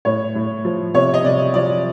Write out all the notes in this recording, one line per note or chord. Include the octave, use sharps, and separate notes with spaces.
A2 C#5
A2
F3
C3 C#5
D#5
C3 D5
F3 D5